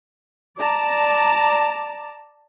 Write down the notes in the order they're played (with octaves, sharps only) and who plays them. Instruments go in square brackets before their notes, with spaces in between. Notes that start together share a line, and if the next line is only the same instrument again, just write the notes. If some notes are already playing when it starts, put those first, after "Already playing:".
[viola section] D5 A5 A#5